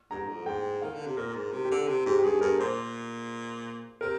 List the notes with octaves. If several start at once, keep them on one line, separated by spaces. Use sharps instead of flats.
G2 A#5
F2
G#2 G5
D#3 F5
D3
C3
A#2 A#4
G#2
C3
G4
D3
C3
G#2 G4
G4
G2 G#4
G2 A#4
A#2 C5
C3 A#4